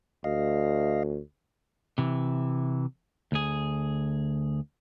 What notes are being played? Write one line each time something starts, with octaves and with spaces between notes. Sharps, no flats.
D2 D#5 F5
C3 E3
D2 G#4